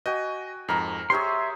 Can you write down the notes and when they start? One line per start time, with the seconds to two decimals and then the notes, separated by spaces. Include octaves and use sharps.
0.06 F#4 D#5 G5 G#5
0.68 F2 G#2 A#4 A#5
1.10 G4 G#4 C5 C#5 E5 C6 C#6